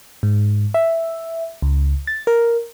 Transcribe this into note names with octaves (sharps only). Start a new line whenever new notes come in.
G#2
E5
C#2
A6
A#4